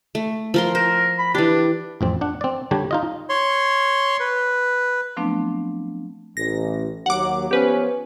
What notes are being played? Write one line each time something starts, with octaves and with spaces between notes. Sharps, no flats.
A3
F3 A#4 C6
A#4 C5
B5
E3 D4 G4
A1 F2 C4
D4 F#5
C4 D5
D3 G3 D4 G4 C#5
D#4 F4 D#5
C#5 C6
B4
F3 F#3 A3 B3 C4 D4
A1 A#6
D#2 F#3 F#5 D6
F3 B3 C#4 G4 B4